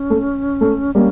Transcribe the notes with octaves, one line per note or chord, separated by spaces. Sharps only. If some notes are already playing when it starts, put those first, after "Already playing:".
Already playing: C#4
A3
A3
G3 A#3 C#4